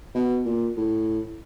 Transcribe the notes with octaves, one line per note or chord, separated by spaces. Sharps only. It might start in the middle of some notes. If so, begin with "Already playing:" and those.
B2
A#2
A2